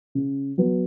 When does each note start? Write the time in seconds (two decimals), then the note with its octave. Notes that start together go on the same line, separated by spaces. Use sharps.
0.15 C#3
0.58 F#3 B3